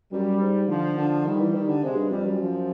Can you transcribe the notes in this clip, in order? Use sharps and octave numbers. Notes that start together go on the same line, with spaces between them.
F#2 G3
G#2
D3 F3
D3
D#3 G3
E3
D#3
D3
C3 G#3
G2
F2 G3
F#2
F3